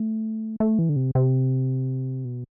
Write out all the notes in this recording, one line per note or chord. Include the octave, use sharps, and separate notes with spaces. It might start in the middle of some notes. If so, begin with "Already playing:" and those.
Already playing: A3
A3
E3
D3
C3
C3
B2